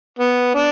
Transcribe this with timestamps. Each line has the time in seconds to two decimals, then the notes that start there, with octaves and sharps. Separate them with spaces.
0.19 B3
0.55 D4